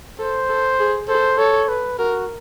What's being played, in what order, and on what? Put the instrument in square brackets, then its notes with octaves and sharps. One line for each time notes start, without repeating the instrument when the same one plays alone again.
[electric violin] A4 [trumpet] C5
[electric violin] A4
G#4
[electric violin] A4 [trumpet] C5
[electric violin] A4 [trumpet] C#5
[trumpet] B4
[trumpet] F#4 [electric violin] A#4